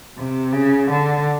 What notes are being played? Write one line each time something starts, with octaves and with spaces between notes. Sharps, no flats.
C3
C#3
D3